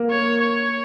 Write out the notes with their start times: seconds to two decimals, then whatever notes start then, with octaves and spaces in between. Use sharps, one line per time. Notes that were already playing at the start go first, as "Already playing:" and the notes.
Already playing: A#3
0.11 C#5
0.41 C#5